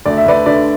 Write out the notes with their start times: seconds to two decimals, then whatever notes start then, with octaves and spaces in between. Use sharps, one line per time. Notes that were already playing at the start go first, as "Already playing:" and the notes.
0.06 D2 D5
0.17 E5
0.26 D2 B4 D5
0.46 D3 B4 D5